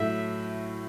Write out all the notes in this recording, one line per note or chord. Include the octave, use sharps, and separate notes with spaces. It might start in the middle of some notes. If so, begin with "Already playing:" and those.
Already playing: A2 F#3 A3 E4 E5